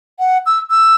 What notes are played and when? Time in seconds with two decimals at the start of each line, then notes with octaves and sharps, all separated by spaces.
0.19 F#5
0.46 E6
0.71 E6